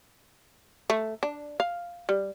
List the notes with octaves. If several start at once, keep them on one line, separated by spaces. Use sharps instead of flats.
A3
D4
F5
G3